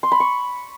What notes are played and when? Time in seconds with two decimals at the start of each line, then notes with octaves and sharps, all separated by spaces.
0.03 C6
0.12 B5
0.20 C#6